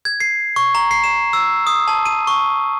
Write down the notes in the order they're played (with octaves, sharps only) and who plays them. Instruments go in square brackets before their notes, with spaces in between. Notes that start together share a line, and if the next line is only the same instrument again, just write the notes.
[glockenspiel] G#6
C7
C#6
A#5
C7
E7
E6
D#6
A5
D#7
C#6